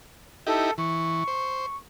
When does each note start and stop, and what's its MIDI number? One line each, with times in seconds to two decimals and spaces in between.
0.47 0.71 63
0.47 0.71 64
0.47 0.71 67
0.47 0.73 69
0.78 1.24 52
0.78 1.76 85
1.28 1.66 72